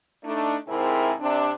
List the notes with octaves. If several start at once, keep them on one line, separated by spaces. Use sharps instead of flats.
A3 D4 D#4
G#2 C3 C4 E4 G#4 A#4
C3 D4